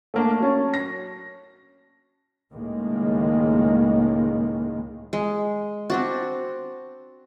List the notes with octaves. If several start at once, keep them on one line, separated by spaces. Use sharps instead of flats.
A3 A#3 D4
F#3 C#4 A5
A#6
C#2 A2 D#3 G#3 A#3
G#3
C4 D4 F#4